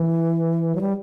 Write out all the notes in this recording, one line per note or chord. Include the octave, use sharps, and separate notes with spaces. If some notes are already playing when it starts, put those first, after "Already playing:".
Already playing: E3
F#3
G3